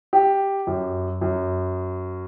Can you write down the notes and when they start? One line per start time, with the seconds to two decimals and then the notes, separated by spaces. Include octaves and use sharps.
0.13 G4
0.67 F#2
1.21 F#2